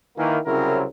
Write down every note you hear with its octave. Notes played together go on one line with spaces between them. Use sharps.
D#3 E3 A#3
C2 C#3 F#3 C4 E4 A#4